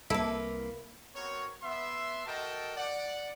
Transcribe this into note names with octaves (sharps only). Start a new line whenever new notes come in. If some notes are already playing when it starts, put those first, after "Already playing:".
C2 A#3 E4 A4 B4 E5 D6
B3 C4 F#4 A#4 C#5
B3 E5 C6
F#4 A4 A#4 D#5 G5 A5
D5 F#5